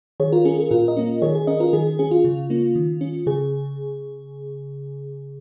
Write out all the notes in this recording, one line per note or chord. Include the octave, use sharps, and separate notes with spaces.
D#3 G#4 C#5
F4 A#4
C#4 G#4
G#4
A#2 F4 A#4
A#4 D#5
A#3 C#4
D#3 G#4 C#5
G#4
C#4 A#4 D#5
F4 A#4
D#3 G#4
G#4
C#4 G#4
F4
C#3
A#3 C#4
D#3
C#4
C#3 G#4